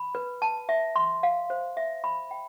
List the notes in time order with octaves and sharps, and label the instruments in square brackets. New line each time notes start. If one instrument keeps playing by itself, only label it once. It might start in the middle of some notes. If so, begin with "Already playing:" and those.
Already playing: [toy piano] B5
B4
A5
E5
C6
F5
C5
E5
B5
G5